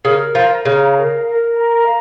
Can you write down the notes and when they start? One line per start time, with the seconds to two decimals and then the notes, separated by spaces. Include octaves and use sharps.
0.04 C#3 A#4
0.35 F3 A#5
0.65 C#3 F5
0.95 A#4
1.26 A#4
1.56 A#5
1.86 F5